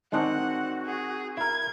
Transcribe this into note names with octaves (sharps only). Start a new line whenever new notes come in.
D#3 G#3 C4 D4 F#4 F#5 F#6
G#4
E4 A#4 G#6